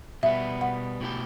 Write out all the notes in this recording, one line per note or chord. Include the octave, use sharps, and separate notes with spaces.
B2 G3 B3 E5
F#5
B2 A3 E4 G4